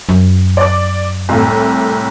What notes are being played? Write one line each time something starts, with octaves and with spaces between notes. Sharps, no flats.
F#2
D5 D6
C2 A2